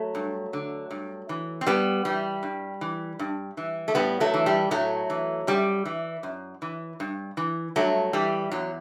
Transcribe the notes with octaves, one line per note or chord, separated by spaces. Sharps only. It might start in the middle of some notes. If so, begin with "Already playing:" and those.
Already playing: F#3 A3
G2
D3
G2
E3
C4
G2 G3 B3
E3 G3
G2
E3
G2
E3
A3
A2 G3 B3
F#3 A3
E3
G3
A2 F#3 A3
E3
F#2 G3
E3
F#2
E3
G2
E3
G2 F#3 A3
E3 G3
E2 F#3